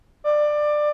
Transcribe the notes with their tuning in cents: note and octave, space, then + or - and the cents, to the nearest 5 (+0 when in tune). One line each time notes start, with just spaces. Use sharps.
D5 +20